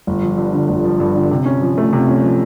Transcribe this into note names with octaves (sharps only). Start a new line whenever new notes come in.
G1
F3
G2
D3
G1
F3
G2
D3
C3
C#4
F3
A3
C3
C#4
F3